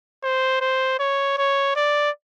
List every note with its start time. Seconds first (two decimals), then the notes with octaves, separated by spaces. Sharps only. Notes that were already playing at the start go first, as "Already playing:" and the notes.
0.23 C5
0.61 C5
0.99 C#5
1.38 C#5
1.76 D5